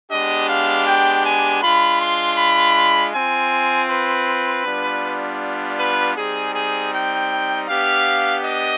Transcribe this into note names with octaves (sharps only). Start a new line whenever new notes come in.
G#3 B3 D4 G4 D#5
F5
G5
G#5
G#3 D4 F4 B5
C6
B5
C4 F4 G#5
B4
G3 B3 D4 F4
B4
G3 C4 D#4 G#4
G#4
G5
B3 D4 G4 F5
D#5